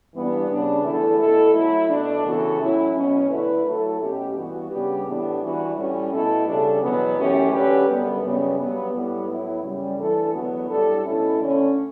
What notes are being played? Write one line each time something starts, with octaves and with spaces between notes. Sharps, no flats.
G2 E3 G3 B3 D4
C#3 G3 B3 D4
E2 D3 A3 E4 A4
B2 A3 E4 A4
F#3 A3 E4
B2 A3 D4
C#3 E3 B3 F#4 A4
A2 F#3 C#4 E4
B2 F#3 C#4
D3 A3 E4 B4
F#3 A3 E4 A4
B2 A3 C#4 G4
G2 E3 B3 F#4
C#3 G3 B3 D4 G4
A2 E3 B3 D4 G4
E3 G3 D4 F#4 B4
A2 G3 C#4
B2 A3 E4 A4
C#3 G3 D4 A4
E2 B2 F#3 B3
F#2 E3 A3 C#4 G4
D3 F#3 C#4 G4 B4
F#2 D3 G3 B3
F#2 C#3 G3 B3
G2 F#3 B3
A2 G3 B3
A2 F#3 B3 E4
F#2 C#3 G3
E3 A3 D4 A4
E2 D3 F#3 B3 F#4
A2 G3 D4 A4
B2 A3 C#4 E4 A4
D3 A3 C#4